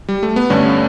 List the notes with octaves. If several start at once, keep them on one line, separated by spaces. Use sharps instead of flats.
G3
A3
B3
G2 D3 A3 C#4